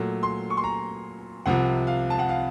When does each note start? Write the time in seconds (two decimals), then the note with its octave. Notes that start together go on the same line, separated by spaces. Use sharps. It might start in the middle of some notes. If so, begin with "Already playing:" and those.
Already playing: A#2 F#3 A3
0.23 C6
0.50 C#6
0.57 C6
0.64 A#5
1.46 C2 C3 F3 F#5
1.87 F5
2.10 A5
2.19 F#5
2.29 F5